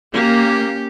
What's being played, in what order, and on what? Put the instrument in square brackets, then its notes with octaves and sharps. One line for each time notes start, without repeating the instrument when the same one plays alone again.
[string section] A#3 [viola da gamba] C#4 G4